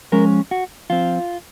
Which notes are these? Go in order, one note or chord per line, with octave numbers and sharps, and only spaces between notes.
F3 G#3 C#4 A#4
F#4
F3 C4 F4